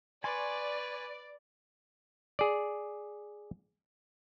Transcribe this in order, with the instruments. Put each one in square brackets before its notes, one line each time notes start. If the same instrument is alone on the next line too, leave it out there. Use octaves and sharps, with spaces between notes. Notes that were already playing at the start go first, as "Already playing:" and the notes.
[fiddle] B4 [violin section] D5 [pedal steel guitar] G#5 C6 C#6
[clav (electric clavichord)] G#4 D5